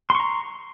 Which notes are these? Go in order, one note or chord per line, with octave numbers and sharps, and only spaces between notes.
A#5 C6 C#6